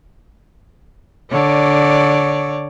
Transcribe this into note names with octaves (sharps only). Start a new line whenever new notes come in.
D3 C#5 D5